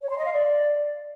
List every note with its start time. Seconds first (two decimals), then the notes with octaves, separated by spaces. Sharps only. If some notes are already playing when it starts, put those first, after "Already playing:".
0.01 C#5
0.09 C6
0.17 D#5
0.25 F5
0.33 D5